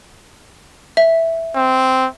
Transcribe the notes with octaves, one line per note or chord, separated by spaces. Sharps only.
E5
C4